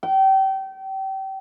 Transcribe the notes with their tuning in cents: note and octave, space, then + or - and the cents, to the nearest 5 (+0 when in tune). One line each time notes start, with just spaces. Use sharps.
G5 -30